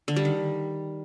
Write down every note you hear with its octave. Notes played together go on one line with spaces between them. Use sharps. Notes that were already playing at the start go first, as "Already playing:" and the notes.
D3
G3
D#3